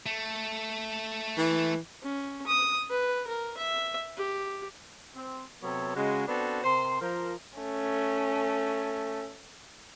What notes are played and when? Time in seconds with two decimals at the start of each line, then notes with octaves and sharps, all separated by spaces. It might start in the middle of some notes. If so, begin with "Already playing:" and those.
0.06 A3
1.37 E3
2.03 C#4
2.47 D#6
2.90 B4
3.27 A#4
3.58 E5
4.18 G4
5.15 C4
5.63 C3 F#3 B3 A4 C#5
5.96 C#3 G#3 F#4
6.27 B3 C4 D4 F#4 A4 C5
6.63 C3 A#4 C5 C6
7.01 F3 A#4 C5
7.59 A3 C#4